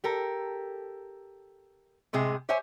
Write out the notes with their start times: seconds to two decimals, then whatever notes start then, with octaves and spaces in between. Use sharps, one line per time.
0.04 G4 A4 A#4
2.13 A2 C3 G#3 G#4
2.49 G4 C5 C#5 E5 G#5